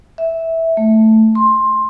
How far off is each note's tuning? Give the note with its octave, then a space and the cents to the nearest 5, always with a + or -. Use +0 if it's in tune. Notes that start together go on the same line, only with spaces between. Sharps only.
E5 -10
A3 +5
C6 +15